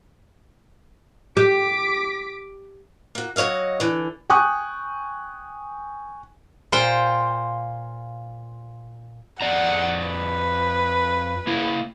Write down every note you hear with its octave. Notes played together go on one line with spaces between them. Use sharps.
G4 D6 B6
A#3 F#4
F#3 F#4 C#5 D#5 F5
D3 E3
G5 G#5 C#6 D#6 F#6
A#2 F4 C5 G5
F2 D5 F#5 A#5
B4
A#3 E4